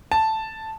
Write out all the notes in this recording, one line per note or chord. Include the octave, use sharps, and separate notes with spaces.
A5